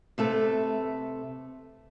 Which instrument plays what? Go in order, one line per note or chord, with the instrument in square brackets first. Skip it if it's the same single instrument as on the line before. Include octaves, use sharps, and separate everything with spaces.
[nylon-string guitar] C3 A3 A4 B4